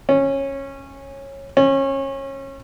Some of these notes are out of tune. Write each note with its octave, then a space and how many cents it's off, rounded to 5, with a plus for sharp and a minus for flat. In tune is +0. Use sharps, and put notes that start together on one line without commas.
C#4 -15
C#4 -25